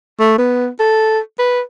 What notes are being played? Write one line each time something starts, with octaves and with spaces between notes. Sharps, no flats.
A3
B3
A4
B4